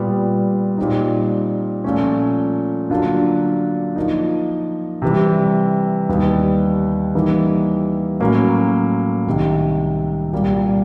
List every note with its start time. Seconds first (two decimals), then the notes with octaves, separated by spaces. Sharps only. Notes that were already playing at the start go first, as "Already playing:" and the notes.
Already playing: A#2 G3 B3
0.78 A#2 G3 C4 D#4
1.84 A#2 F3 A3 C#4
2.90 D3 F#3 A#3 D4 F4
3.96 F3 A#3 D#4
5.02 C3 E3 G3
6.09 D#2 D#3 G3 B3
7.15 E3 G3 A#3 D#4
8.20 A2 F#3 A#3 C#4
9.26 C2 C3 D#3
10.33 C2 A#2 G3 A#3